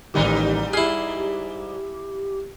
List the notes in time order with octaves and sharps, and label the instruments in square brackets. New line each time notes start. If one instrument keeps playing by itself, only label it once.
[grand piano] A1 D#3 [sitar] G#2 G3 D#4 [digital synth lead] G4
[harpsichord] E4 G#4 [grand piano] F6 C7